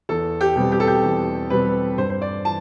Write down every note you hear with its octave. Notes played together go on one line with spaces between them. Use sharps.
E2 A4
G4
B2 G3 C4
G4
A4
G4
E2
B2 G3 C4 B4
G2 C5
C5
D5
E3 A5